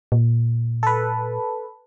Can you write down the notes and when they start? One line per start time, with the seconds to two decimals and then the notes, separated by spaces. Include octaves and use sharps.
0.12 A#2
0.83 A4 B4